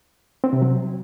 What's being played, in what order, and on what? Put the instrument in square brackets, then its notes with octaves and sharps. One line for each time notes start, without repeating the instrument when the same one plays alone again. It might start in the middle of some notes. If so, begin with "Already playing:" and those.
[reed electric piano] C4
C3
F#3